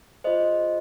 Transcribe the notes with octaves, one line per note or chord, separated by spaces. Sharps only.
F4 G#4 C5 D#5